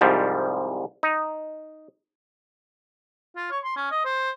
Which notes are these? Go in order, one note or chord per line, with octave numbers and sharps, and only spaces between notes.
C2 G#2 F3 G3
D#4
F4
C#5
C6
C#4
D#5
C5